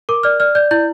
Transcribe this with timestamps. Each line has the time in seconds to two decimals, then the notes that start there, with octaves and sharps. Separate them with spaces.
0.09 A#4 D6
0.23 D5 F6
0.40 D5 F6
0.55 D5 G6
0.71 E4 G6